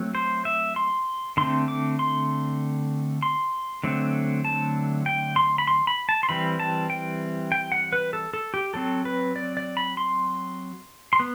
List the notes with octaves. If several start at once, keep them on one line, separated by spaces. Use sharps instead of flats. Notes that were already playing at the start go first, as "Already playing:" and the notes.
Already playing: F#3 A3 C4
C5
E5
C6
D3 A3 C4 C6
D6
C6
C6
D3 F#3 A3 C4
A5
G5
C6
B5
C6
B5
A5
C6
E3 G3 C4 B5
A5
G5
G5
F#5
B4
A4
A4
G4
F#3 C4 A4
B4
D5
D5
B5
C6
C6
B3